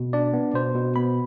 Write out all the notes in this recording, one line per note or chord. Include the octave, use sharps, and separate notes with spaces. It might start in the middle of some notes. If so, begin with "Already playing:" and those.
Already playing: B2
D4 D5
B3
B2 C5
B2
B3 B5